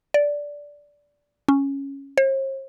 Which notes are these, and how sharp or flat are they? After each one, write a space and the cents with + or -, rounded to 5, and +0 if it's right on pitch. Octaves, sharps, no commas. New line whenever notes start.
D5 -10
C#4 -5
C5 +45